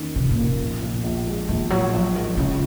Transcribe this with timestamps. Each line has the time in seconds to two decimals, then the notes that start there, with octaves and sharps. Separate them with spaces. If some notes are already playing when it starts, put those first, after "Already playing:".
Already playing: F2 D#3 A#3 C#4
0.15 F2 C3
0.31 A#2
0.37 A#3
0.60 A#1
0.82 A#2
1.04 A#1
1.27 G#3
1.49 A#1 D#3
1.70 A#2 F#3
1.93 A#1 F3
2.15 D#3 G#3
2.37 C#3 F4